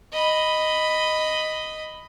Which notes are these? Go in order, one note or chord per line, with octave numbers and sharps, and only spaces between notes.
D#5 B5